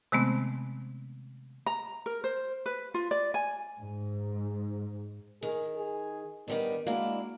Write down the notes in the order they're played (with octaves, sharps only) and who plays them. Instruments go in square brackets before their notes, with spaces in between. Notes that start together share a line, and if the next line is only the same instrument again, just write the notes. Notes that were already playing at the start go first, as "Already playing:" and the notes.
[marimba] C3 D#3 G#3 A3 B3 C4
[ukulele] A#5
A#4
C5
B4
F4
D5
G#5
[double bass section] G#2
[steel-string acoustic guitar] D#3 [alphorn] G#4
[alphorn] G#4
[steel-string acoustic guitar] D#3 G3 D4 [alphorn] B3
[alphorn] G#3 [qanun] A#3 F#4 [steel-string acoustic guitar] D4 E4